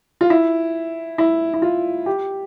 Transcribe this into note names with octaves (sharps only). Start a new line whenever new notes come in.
F4
E4
E4
E4
F4
G4